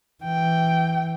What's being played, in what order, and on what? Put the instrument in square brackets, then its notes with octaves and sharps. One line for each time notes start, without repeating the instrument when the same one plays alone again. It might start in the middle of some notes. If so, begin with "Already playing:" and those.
[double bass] E3 [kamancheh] G5